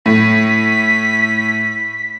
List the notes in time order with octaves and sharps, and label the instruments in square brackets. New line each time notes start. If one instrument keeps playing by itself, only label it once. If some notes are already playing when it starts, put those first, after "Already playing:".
[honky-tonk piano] A2 [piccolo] B6